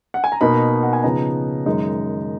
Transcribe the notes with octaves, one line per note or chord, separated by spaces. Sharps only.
F#5
G#5
A#5
B2 A#3 D#4 B5
F#5
G#5
C#3 F3 B3 D#4 A#5
F#2 D#3 G#3 D#4